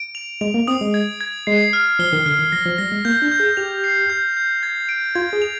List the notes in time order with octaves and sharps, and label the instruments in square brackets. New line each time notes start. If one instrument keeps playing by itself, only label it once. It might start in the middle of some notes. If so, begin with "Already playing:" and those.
Already playing: [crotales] D7
F7
[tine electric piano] G#3 [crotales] F7
[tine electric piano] A#3
[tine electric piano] C4 [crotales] D#6
[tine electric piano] G#3
[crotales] G#6
G#6
[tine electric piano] G#3 [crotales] C7
[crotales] F6
[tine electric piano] F3 [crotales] G7
[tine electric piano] D#3
[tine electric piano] D3 [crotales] F6
[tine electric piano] D#3
[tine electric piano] F3 [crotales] A#6
[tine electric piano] F3
[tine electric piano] G3 [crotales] A#6
[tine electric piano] G#3
[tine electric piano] A#3 [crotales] G6
[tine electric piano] D4
[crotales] G6
[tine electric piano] G#4
[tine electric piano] G4 [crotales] F7
[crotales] C7
G6
G6
G#6
D7
[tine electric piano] F4 [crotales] G#6
[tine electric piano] G#4
[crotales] F7